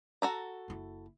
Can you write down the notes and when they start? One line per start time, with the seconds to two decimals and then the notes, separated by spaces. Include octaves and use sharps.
0.22 F#4 A4 A#5
0.68 F#1 E4